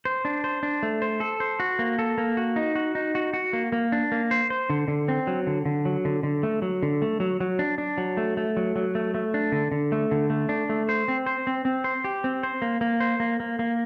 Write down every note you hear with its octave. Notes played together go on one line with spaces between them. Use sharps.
C5
D4
C5
D4
A3
C5
A4
C5
F#4
A#3
A4
A#3
F#4
D#4
F#4
D#4
F#4
F#4
A#3
A#3
D4
A#3
C5
C5
D3
D3
C4
F#3
D3
D3
F#3
D3
D3
A3
F#3
D3
A3
F#3
F#3
D4
D4
F#3
A3
A3
F#3
F#3
A3
A3
D4
D3
D3
A3
D3
A3
D4
A3
C5
C4
C5
C4
C4
C5
G4
C4
C5
A#3
A#3
C5
A#3
A#3
A#3